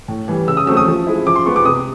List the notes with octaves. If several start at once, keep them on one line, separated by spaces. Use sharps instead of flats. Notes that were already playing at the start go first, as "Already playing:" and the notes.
A2
E3 G3
C#3 E6
D#6
F#3 A3 C4 E6
D#6
F3
G#3 C4 E4
F3 D6
C6
G#3 B3 C#6
D6
C3 D#6